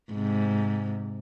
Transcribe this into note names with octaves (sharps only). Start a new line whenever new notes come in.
G#2 C3